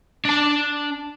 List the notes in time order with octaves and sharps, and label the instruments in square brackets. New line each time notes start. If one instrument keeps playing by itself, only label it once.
[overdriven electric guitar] D4 A5